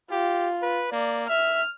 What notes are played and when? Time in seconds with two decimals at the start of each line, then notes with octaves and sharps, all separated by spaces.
0.11 F4 G4
0.62 B4
0.92 A#3 D5
1.29 E5 F6